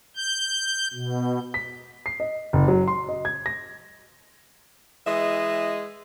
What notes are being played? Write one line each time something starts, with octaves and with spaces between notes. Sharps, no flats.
G6
B2
B6
C7
D#5
F#1
F#3
C6
D#5
G#6
A#6
E3 G#3 D#5 E5